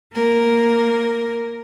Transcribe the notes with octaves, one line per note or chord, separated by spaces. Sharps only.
A#3 A#4